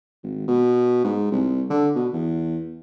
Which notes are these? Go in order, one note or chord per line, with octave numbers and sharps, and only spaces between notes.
G#1
B2
G#2
C2
D3
B2
E2